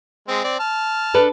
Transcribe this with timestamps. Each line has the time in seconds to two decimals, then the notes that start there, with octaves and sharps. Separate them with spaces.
0.28 G#3 C4
0.44 C4 D5
0.60 A5 F6
1.14 D4 A4 B4